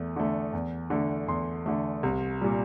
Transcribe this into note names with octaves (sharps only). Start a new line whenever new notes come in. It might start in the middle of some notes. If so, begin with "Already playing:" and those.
Already playing: E2 A3
D3 A3
E2
D3 A3
E2 C6
D3 A3
C2
A#2 G3